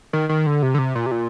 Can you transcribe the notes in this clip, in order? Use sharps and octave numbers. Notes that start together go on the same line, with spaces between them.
D#3
D#3
D3
C3
D3
C3
A#2
C3
A#2